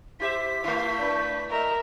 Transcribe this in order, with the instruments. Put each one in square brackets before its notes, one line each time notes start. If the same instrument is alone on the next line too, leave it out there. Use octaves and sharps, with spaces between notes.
[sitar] E4 G4 E5 [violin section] C5 [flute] B6
[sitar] A3 E4 [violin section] F5
[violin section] D4 B4
[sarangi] A#4 [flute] D#5 [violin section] E5